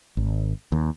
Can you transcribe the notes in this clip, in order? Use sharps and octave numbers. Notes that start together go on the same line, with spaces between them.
G#1
D#2